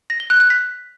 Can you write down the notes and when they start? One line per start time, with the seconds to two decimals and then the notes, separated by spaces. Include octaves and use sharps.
0.10 A#6
0.20 G7
0.30 F#6
0.40 F#6
0.50 B6